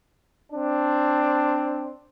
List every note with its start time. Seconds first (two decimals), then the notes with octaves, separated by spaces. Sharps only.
0.52 C4 D4